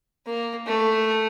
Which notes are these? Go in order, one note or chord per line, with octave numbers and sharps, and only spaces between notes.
A#3
A3